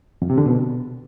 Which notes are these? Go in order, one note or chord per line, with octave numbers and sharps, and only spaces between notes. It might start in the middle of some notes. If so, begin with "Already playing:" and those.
F2
C3
D3
B2